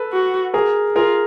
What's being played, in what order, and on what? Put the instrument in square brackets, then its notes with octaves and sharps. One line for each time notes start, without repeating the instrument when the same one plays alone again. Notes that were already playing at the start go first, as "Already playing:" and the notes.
Already playing: [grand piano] A4 B4
[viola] F#4
[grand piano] G#4 A#4
[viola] F4 [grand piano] G#4 A#4